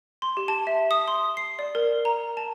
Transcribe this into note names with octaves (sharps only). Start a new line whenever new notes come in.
C6
G4
A5
E5
D#6
C6
C7
D5
A#4
A#5
A5